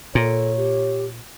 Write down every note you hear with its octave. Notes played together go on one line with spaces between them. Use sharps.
A#2 A4 C#5
G4